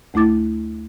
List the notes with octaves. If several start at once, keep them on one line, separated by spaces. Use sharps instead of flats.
D2 A3 E4 D6 A6